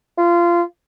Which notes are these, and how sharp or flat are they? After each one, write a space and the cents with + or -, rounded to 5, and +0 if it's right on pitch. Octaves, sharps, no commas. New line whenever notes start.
F4 -20